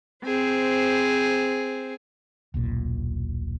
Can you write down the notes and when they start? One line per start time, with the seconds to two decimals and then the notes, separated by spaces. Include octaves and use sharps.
0.24 C4 G#4 C5
2.54 D#1 B1 A#2